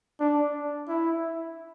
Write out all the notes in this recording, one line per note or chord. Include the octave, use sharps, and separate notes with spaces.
D4
E4